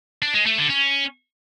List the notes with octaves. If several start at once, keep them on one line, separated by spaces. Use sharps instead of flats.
D4
G#3
A3
D3
C#4